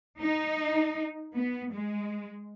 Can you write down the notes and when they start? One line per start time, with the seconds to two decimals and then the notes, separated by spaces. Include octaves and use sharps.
0.21 D#4
1.35 B3
1.73 G#3